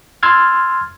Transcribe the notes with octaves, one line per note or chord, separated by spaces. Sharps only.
C6 E6 F6 G#6 A6